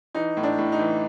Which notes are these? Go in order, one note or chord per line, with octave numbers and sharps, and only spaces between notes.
E3 D#4
A2
D4
A2
D#4
E3